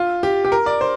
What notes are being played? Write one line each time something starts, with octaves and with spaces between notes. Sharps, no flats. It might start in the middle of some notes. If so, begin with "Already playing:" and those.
Already playing: F4
G4
G4
A#4
D5
C5